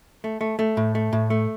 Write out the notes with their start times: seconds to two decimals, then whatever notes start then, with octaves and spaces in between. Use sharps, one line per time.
0.24 A3
0.41 A3
0.59 A3
0.77 A2
0.95 A3
1.13 A2
1.30 A3